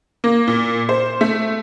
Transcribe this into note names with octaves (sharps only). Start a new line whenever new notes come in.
A#3
A#2
C5
A3